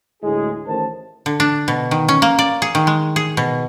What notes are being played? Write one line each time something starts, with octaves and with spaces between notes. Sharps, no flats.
D2 A2 G#3 E4 G#4
A1 A2 D#3 C5 A5
D3
D4
B2
D#3
C#4
A#3
D5
G#4
D#3
G#3
G#4
B2